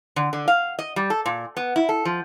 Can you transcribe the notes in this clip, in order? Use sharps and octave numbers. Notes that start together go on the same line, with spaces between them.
D3
D3
F5
D#5
G3
A4
A#2
B3
E4
A4
F3